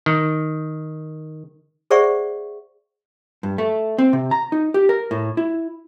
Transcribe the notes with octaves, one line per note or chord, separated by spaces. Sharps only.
D#3
G#4 C5 D5 E5 F#5 C#6
G2
A3
C4
C3
A#5
D#4
G4
A#4
A2
E4